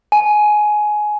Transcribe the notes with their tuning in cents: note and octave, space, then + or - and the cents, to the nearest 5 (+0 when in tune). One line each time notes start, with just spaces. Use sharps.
G#5 +15